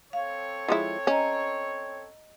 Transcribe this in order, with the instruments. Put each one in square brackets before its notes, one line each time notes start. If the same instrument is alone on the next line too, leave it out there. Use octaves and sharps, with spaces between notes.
[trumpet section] C4 A4 C#5 [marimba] F5
[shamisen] F3 G#3 E4
[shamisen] C#4 [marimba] D#5 A#5